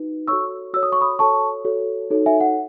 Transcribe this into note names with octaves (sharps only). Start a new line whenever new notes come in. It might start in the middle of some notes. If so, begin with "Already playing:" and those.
Already playing: D#4 F#4 B4
F#4 A4 C#5 C#6 E6
F#4 A4 C#5 E6
D#6
C#6
B5 D#6
F#4 A4 C#5 A5 C#6
F#4 A4 C#5
D#4 F#4 A4 C#5
E5 G#5
F#5